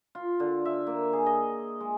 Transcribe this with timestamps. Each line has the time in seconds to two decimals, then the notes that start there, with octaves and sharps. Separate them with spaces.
0.15 F4
0.40 D3
0.65 E5
0.87 A#3
1.13 G#4
1.26 D#5
1.80 G#3